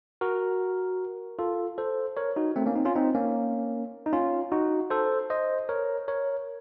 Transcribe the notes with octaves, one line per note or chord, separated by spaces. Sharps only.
F#4 A#4
F4 A4
A4 C5
A#4 C#5
D#4 F#4
A3 C4
A#3 C#4
C4 D#4
C#4 F4
C4 D#4
A#3 C#4
D#4
C#4 F4
D#4 F#4
A4 C5
C5 D#5
A#4 C#5
A#4 C#5